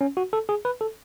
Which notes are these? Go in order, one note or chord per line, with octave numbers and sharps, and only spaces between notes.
C#4
F#4
A4
G#4
B4
A4